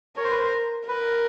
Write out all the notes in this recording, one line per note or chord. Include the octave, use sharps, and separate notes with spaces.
A#4 C#5
C5
B4
C5
A#4 B4